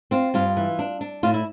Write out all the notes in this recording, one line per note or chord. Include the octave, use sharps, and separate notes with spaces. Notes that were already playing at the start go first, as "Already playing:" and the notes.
C4 F4
G2 F4
E3
D4
D4
A2 F4
E4